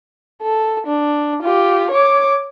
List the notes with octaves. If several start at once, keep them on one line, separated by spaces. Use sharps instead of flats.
A4
D4
F4 G4
C#5 D6